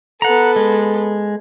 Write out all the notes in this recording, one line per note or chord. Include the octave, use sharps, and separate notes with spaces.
B3 A4 F#5 A#5
G#3